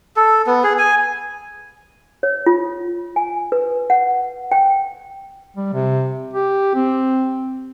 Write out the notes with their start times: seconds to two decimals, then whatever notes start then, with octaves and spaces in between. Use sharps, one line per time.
0.16 A4
0.47 B3
0.64 G#4
0.79 G#5
2.23 C#5
2.46 F4
3.16 G#5
3.52 B4
3.90 F#5
4.52 G5
5.56 G3
5.73 C3
6.33 G4
6.75 C4